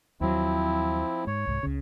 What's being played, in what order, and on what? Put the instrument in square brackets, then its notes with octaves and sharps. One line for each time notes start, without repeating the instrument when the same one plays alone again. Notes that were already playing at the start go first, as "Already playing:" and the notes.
[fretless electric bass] D#2 F#3 [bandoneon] F3 C4 E4
[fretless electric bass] G#2 [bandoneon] C#5
[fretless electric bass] C2 G#2
C#2 C#3